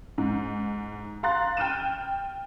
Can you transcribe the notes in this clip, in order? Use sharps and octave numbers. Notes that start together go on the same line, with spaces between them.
G#2
F5 A#5 C6 F#6 A6
G5 F6 F#6 D#7 E7